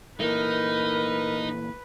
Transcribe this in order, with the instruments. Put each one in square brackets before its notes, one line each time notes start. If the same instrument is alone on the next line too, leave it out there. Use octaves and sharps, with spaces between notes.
[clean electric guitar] A#2 E3 A3 [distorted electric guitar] D#4 [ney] A#4 [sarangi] B4